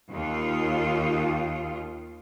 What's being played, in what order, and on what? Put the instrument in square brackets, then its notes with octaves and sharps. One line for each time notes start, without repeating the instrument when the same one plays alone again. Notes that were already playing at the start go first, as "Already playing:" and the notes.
[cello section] D#2 F4